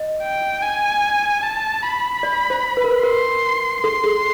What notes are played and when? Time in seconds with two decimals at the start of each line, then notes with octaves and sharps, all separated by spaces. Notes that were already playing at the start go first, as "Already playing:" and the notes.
Already playing: D#5
0.23 G5
0.62 G#5
1.43 A5
1.83 B5
2.23 D5
2.50 C5
2.77 B4
2.84 A#4
2.91 B4
3.03 A#4 C6
3.83 A4 C6
4.04 G#4